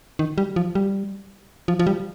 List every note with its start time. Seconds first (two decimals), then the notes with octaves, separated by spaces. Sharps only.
0.19 D#3
0.38 G3
0.56 F3
0.75 G3
1.68 F3
1.79 F3
1.87 G3